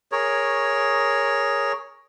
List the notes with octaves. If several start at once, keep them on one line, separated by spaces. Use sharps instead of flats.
G#4 A#4 C#5